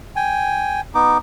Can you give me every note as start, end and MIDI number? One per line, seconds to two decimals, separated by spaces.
0.16 0.81 79
0.16 0.81 80
0.95 1.18 59
0.95 1.18 63
0.95 1.18 86